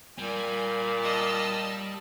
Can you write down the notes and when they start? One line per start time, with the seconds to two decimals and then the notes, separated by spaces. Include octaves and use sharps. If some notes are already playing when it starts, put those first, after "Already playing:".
0.19 A#2 G3 G#5
1.03 D#5 A5 E6 F6